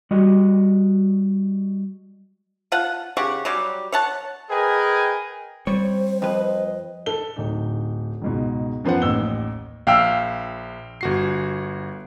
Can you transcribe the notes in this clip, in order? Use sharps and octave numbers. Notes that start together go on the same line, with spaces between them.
G3 F#4 D#5
F4 F#5 A5
C#3 G4 F#5 C#6
F#3 G3 F#4 G4
C#5 F#5 A5
G#4 A#4 B4 D#5 G5 G#5
G3 C4 C5 C#5
F2 B4 D#5
A4 G7
D1 D#4
C#2 G#2 B2
F#2 F3 B3 C5 F#5
A1 D#2 E6 G7
A#1 F5 G5 E6
G1 F#4 C7